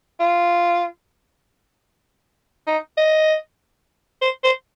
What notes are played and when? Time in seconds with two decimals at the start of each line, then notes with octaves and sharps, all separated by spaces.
0.20 F4
2.67 D#4
2.97 D#5
4.22 C5
4.44 C5